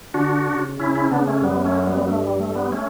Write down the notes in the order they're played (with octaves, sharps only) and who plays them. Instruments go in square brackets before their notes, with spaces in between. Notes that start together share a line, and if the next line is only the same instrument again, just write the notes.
[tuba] D3 [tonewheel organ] D4 F#4
[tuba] C#3
[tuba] C#3 [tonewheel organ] C#4 E4
[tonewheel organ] C#4 E4
[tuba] C#3 [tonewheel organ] B3 D4
[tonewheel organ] A3 C#4
[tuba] F#2 [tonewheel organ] G3 B3
[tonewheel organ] A3 C#4
G3 B3
B3
[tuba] G2 [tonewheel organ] A3
[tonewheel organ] G3
A3
G3 B3
A3 C#4